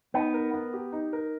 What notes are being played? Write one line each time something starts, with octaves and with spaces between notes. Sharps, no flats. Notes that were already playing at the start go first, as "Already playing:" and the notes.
B3 D#4
A#4
B3
G4
D#4
A#4